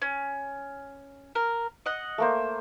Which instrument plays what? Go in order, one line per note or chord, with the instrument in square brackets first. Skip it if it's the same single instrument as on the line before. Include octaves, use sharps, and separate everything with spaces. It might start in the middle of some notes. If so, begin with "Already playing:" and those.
[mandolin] C#4
A#4
D#5 F#5
[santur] A3 A#3 C5